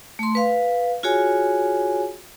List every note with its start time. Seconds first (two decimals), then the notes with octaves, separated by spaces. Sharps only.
0.19 A3 C6
0.35 B4 F5
1.03 F4 F#4 G#4 C#5 G#5